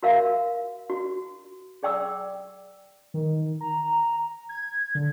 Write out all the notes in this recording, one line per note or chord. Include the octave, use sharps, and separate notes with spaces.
F#4 A#4 E5 F5
F#4
G#4 D5 G5 D6 E6
D#3
A#5
G#6
D3